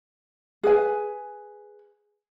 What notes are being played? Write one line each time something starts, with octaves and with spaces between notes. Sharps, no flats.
G#4 B4 G#5